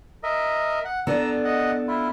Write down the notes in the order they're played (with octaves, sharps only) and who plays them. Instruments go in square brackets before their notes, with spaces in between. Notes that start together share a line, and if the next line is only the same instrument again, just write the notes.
[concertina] A#4 D#5 E5
F#5
[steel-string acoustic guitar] B3 D4 A4 [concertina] A#5 E6
[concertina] D#5 F#5
E4 F4